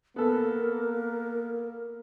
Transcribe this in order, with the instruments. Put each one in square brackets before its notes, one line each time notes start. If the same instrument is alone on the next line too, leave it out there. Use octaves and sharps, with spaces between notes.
[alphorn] A#3 [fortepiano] B3 A4 [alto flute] A#4